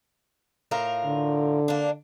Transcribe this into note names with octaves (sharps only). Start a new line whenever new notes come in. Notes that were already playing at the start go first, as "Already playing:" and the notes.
A2 F4 A#4
D3
A#3 D4